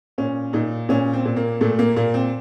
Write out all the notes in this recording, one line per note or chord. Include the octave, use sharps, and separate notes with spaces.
A#2 C#4
A#2 D#4
A#2 C#4
C4
A#2
A#3
A#2 A3
A#3
A#2 A#3
C4